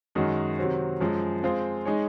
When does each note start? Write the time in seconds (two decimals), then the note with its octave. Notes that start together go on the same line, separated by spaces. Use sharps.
0.15 F#2 D#3 G#3 D#4 F#4
0.58 C3 D#3 F#3 C4 F#4
1.00 F#2 F3 G#3
1.43 G#3 C4 F4 G#4 C5
1.85 G#3 D#4 G#4 C#5